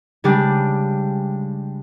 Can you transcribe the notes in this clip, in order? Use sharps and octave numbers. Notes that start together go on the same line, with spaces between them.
C#3 G3 G#3 D4 G4